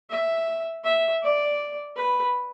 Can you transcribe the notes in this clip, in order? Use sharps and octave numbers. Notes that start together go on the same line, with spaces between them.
E5
E5
D5
B4